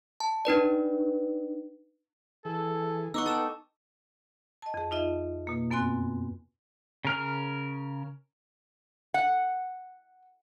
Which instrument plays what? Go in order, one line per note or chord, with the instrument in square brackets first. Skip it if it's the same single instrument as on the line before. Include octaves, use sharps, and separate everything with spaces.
[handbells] A5
D4 D#4 B4 D5
[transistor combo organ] E3 G#4 [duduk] A4
[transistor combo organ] B3 [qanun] D#4 F#5 [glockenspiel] C#6 D6 E6
[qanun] A4 G5 [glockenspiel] A5 E6 E7
[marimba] D#5 A5
F2 G#4
D#4 F4 D#5 E5
B2 A#3
F#2 B3 C4 G#5 C6 F#6
[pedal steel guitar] C#3 A#4 F6
[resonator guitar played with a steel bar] F#5